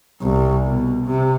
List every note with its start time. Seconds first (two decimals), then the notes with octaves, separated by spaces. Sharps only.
0.21 C2
0.66 B2
1.07 C3